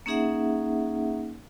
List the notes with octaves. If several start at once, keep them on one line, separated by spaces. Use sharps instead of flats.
A#3 C#4 D#4 G#4 E5 F#5